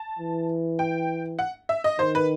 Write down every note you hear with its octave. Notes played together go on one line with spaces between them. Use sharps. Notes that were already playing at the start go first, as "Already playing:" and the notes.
Already playing: A5
E3
G5
F#5
E5
D#5
D#3 C5
B4